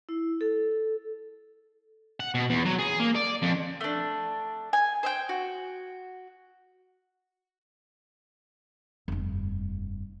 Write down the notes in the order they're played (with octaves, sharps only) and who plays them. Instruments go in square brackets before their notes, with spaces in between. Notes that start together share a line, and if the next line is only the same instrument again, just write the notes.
[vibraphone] E4
A4
[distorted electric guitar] F#5
B2
E2
F#3
G#4
A#3
D5
F2
[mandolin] A3 D4
G#5
C5 E5 G5
F#4
[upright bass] F1 G2